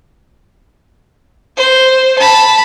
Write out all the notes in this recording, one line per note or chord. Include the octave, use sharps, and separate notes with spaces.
C5
A5 B5